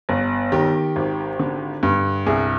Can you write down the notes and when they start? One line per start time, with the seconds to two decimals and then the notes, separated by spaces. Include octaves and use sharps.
0.09 G1
0.52 D#3 G4
0.96 G#1
1.39 D3
1.83 G2
2.26 C2 G#4